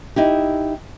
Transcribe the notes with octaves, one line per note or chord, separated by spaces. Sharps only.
D#4 E4 G4